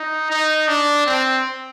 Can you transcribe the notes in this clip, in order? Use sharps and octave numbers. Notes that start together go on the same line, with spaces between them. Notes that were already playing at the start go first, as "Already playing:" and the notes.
Already playing: D#4
D#4
D4
C4